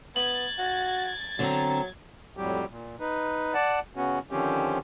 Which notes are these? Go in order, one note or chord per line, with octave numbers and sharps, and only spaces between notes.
B3 G#6 A6 F#7
F#4
D3 F#3 C4 A#5
F2 A2 F#3 G3 G4
A#2
D#4 B4
D5 F#5 A5
C#3 B3 C#4 F#4
D3 D#3 F3 C4 C#4 G4